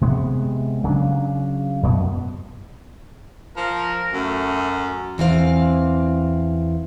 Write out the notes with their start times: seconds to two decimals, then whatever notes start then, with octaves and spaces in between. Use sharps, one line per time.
0.01 C3 G#3 B3
0.84 C#3 F#3 D4
1.83 F#2 B2 B3
3.57 F3 A#4
4.14 F#2 A3
5.18 E2 E3 C4 F5